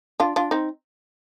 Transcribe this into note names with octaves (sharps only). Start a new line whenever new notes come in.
D4 F4
D4 F4
C4 D#4